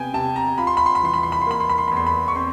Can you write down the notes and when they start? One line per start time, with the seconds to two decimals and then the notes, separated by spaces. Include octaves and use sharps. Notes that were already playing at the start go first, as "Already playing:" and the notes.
Already playing: C3 B3 G5 G#5
0.14 C3 A5
0.36 A#5
0.58 F4 B5
0.67 C6
0.77 B5
0.86 C6
0.95 B5
1.03 E3 C6
1.14 B5
1.23 C6
1.32 B5
1.41 C6
1.47 A#3 B5
1.60 C6
1.69 B5
1.78 C6
1.88 E2 B5
1.97 C6
2.06 B5
2.28 C#6
2.36 C4 C6